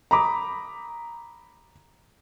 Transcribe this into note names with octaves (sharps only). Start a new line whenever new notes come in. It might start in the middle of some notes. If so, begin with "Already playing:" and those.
A#5 B5 D6 D#6